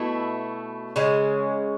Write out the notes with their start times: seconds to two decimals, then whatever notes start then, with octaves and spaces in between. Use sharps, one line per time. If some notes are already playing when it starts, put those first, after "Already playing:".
Already playing: B2 A3 E4
0.96 C#3 G#3 C#4